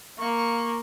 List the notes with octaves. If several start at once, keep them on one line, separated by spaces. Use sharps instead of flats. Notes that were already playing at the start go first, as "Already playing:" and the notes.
A#3 C#6